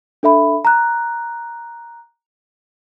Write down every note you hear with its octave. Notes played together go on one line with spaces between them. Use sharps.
D4 A4 E5 B5
A#5 F#6